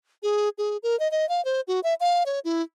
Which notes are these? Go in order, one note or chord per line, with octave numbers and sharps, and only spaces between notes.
G#4
G#4
A#4
D#5
D#5
F5
C5
F#4
E5
F5
C#5
E4